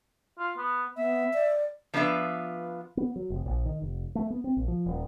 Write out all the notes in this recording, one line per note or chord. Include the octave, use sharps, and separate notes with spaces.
F4
B3
B3 E5
D5
F3 B3 D4 F4 B4 E5
B3
F#3
F1
A#1
D#3
F1
A3
B3
C4
A#1
F3
D#1